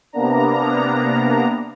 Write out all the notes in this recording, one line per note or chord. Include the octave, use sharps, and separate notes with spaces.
C3 A#3 B3 D4 A#5